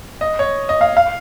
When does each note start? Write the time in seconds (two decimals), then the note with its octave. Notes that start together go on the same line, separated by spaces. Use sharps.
0.21 D#5
0.39 C#5
0.69 D#5
0.81 F5
0.97 F5